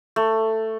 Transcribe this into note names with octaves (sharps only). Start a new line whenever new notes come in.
A3